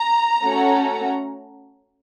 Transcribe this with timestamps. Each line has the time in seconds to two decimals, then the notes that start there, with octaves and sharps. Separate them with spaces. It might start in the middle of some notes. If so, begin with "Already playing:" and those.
Already playing: A#5
0.43 A3 C#4 F#4 A4